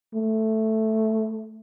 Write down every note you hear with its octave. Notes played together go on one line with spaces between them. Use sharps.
A3